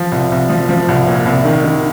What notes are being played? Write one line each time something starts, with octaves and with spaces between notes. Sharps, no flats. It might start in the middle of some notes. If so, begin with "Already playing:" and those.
Already playing: F3
C2
C2
F3
F3
C2
A#2
C2
D#3
D#3